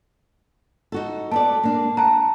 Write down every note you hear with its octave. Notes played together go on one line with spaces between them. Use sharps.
D#4 F#4 A4
B3 A4 D5 A5
A#3 D4
F#5 A5 A#5